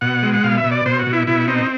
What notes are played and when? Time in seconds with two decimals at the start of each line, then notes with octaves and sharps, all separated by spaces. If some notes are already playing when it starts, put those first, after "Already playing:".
0.01 B2 F#5
0.23 G#3
0.34 F#5
0.44 B2 F5
0.58 E5
0.64 B2
0.71 D5
0.86 B2 C5
0.99 F#4
1.07 B2
1.13 E4
1.27 B2 E4
1.48 C4 D#4